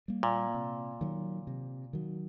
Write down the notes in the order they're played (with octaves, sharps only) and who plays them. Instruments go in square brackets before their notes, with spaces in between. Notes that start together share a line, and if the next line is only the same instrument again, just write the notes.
[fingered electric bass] G3 A#3
[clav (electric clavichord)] A#2
[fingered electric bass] C3
D#3 F#3
C3
D#3 F#3